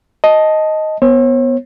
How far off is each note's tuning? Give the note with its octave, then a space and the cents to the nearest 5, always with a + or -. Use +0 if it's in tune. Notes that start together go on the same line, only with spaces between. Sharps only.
D#5 +5 A5 -5
B3 +0 C#5 -40